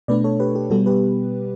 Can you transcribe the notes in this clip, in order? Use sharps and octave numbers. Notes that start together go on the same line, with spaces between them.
B2 A3 D4 B4 D5
A4 C#5
G4 B4
G4
B2 G3 B3 F#4 A4
G4 B4